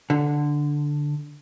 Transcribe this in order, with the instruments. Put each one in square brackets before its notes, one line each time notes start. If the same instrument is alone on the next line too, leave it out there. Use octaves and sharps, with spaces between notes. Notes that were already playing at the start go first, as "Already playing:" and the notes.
[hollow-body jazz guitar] D3